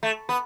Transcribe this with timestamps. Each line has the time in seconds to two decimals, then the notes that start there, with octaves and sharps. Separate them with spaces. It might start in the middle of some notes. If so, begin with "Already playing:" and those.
0.03 A3
0.29 B3